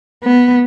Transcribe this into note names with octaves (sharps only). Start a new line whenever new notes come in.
B3